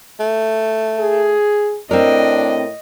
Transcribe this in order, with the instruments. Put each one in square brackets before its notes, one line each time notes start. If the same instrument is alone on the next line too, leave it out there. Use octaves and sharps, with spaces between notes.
[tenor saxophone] A3
[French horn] G#4
[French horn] A2 [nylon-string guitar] C4 A#4 [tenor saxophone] D4 [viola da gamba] D#5